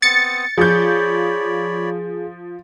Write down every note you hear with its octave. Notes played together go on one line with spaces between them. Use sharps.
B3 C4 D#6 A6 C#7
F3 G#4 C#5 D5 B5 G6